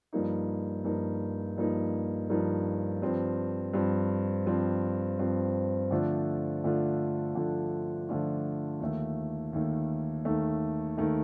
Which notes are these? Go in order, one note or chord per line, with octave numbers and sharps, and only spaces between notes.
G2 F3 A#3 D#4
G2 F3 A#3 D#4
G2 F3 A#3 D#4
G2 F3 A#3 D#4
G2 F3 C4
G2 F3 C4
G2 F3 C4
G2 F3 C4
D3 F3 A3 D4 F4
D3 F3 A3 D4 F4
D3 F3 A3 D4 F4
D3 F3 A3 D4 F4
D#2 D#3 A3
D#2 D#3 A3
D#2 D#3 A3
D#2 D#3 A3